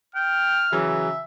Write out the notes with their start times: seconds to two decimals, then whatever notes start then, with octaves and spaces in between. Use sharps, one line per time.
0.15 G5 F6
0.72 C#3 E3 F#3 E5